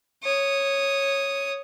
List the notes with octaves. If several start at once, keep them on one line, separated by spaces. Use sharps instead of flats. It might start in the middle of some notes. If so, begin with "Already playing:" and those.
C#5 D#6